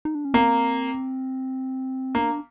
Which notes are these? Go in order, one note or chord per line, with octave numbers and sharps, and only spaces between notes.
D#4
D4
C#4
A#3 C4
A#3 D4